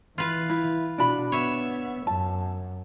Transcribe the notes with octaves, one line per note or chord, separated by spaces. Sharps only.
E3 F4 B4
E4
B2 D4 F#4 B5
B3 C#5 E5
F#2 A5